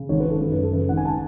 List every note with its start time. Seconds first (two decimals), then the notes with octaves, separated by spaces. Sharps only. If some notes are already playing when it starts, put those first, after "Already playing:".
Already playing: C#3
0.09 G#1 C#5
0.20 B4
0.25 G#1 A4
0.41 F#2 B4
0.52 B4
0.58 F#2
0.63 A4
0.73 C#3 B4
0.89 G#1 F#5
0.97 G#5
1.05 A5